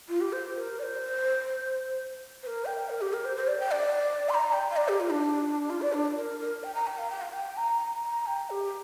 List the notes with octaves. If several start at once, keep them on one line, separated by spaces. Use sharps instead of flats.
F4
G4
C5
A#4
D5
C5
C5
A#4
G5
A#4
G4
A#4
C5
C5
D5
G5
D5
C6
A#5
G5
F5
D5
G4
F4
D4
F4
D5
D4
A#4
A#4
G5
A#5
G5
F5
G5
F5
G5
A#5
A#5
G5
G4